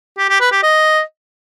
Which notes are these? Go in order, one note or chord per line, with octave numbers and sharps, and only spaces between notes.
G4
G4
B4
G4
D#5